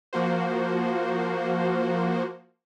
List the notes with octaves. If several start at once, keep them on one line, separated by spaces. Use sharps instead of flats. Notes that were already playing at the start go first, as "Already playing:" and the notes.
F3 A#3 F#4 C5